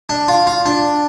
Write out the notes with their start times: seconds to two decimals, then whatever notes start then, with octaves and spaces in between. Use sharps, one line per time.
0.09 D4
0.28 F4
0.47 F4
0.66 D4